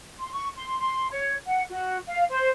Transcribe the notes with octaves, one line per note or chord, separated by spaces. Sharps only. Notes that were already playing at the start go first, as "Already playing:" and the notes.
C6
C#6
C6
C6
C#5
F#5
F#4
F5
C5